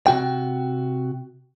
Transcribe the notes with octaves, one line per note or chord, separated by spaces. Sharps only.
C3 F#4 G5